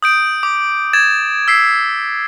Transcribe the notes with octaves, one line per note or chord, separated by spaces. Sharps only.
D#6 G6 D7
D6
G#6 A6 E7
E6 B6 C7